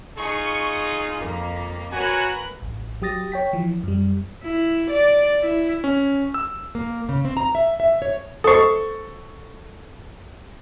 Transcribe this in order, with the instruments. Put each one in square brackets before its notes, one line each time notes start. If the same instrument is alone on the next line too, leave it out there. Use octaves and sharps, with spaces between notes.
[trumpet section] D#4 F4 G#4 [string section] C#6
[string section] F2 A#3
[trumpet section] F#4 C#5 G#5 [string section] A#4 B4 F#6
[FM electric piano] A1
F#3 G4 D#6 A6 A#6
C#5 G5 B6
E3 F3
F#2 G3
[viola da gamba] E4
D5
E4
[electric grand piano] C#4
E6
[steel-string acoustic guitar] A#3
C#3
C4
A#5
E5
E5
C#5
[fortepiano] A4 C#6 [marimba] C5 D#6